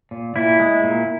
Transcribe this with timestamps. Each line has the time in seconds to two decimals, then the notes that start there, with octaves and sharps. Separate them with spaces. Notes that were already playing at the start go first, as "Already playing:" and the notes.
0.11 A#2
0.36 A#2 E4
0.59 G#3
0.84 A#2